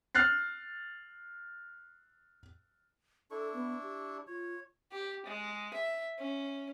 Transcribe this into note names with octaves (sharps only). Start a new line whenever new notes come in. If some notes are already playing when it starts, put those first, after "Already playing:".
F6 F#6 A6 C7
D4 E4 A4 C#6
B3
G4
F4 C#5
G4
G#3
E5
C#4